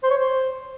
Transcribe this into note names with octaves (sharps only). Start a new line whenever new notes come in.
C5
C#5
C5